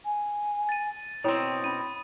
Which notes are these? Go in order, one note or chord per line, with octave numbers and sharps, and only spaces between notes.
G#5
A6 D#7
B2 C4 E4 C#5 G5 D#6
C#4 B5 D#7